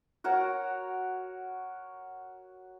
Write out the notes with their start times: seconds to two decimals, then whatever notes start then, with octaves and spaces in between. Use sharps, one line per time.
0.24 F#4 A#4 C#5 F#5